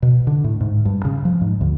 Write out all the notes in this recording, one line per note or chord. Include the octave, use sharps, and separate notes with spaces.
B2
D3
A2
G#2
G2
C#3
F3
G#2
D2